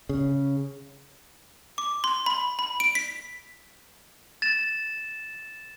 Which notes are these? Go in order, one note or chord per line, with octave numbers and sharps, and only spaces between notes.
C#3
D6
C6
B5
B5
D7
B6
A6 E7